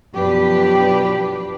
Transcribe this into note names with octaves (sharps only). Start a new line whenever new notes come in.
F#2 B2 F3 D4 G4 B4